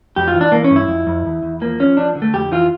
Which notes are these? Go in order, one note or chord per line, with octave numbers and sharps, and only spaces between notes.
F2 G4
F4
E3
D4
E3 A#3
C#4
G2
E4
F2
F2
E2
E2
F3 A#3
F3 C#4
F3 D4
D3
A3
F2 G4
E3 F4